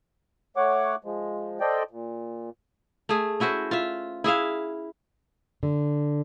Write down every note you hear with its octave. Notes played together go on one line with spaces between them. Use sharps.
A3 C#5 F#5 D6
F3 G#3
A4 C5 D5 D#5 G5
A#2
A3 G#4
C#4 E4 F#4 C5
F4 E5
E4 G#4 E5 F5
D3